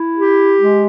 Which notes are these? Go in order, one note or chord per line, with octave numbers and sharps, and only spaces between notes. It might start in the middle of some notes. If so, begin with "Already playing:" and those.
Already playing: E4
G4
G#3